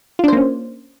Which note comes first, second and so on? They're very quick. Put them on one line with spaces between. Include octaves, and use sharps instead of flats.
F4 D4 C5 A#3 C#4